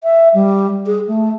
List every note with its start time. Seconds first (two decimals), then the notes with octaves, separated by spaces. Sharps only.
0.04 E5
0.34 G3
0.86 G#4
1.08 A3